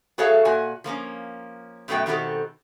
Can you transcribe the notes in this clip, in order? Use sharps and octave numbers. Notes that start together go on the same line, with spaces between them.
F#4 G#4 A4 C#5 E5 F5
A#2 F#4 G#5
F3 A#3 C4 C#4
F#2 B2 A3 B3 F#4 G5
B2 D#3 C4 F#4 G4 A4